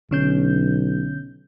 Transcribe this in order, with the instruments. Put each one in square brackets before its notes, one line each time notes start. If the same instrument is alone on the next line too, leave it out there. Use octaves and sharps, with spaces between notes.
[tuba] B1 [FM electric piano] D3 C#4 G6